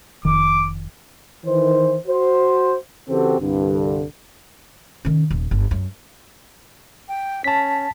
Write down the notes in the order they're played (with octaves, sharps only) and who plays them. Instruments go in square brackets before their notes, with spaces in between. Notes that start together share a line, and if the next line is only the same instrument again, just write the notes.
[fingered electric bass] F1 D#3 [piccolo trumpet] D6
[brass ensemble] D#3 E3 C5
F#4 C5
C#3 E3 C4 F#4 G4 A4
C2 G2 D3
[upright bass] D#3 C#4
D#1
G1
F#2
[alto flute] G5
[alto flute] C#4 [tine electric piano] A5 B6